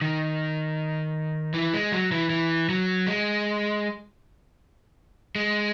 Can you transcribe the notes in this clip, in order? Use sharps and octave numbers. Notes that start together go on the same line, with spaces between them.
D#3
E3
G#3
F#3
E3
E3
F#3
G#3
G#3